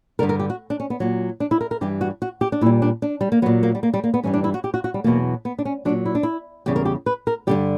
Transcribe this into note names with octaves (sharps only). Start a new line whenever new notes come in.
G2 D3 G3 A#4
A#4
G4
F#4
D4
C#4
B3
A#2 F#3
D4
E4
A#4
A#4
G2 E3 G3 G4
F#4
F#4
G4
D4
A#2 G3 E4
D4
D4
G3
A#3
A#2 F#3 B3
A#3
G3
A#3
G3
A#3
B3
G2 E3 G3 C#4
D4
E4
F#4
G4
F#4
F#4
G3
E2 B2 F#3 A#3
B3
D4
C#4
A#2 F#3 D4
E4
D4
E4
E2 C#3 G3 G4
A#4
G4
B4
A#4
G2 D3 G3 G4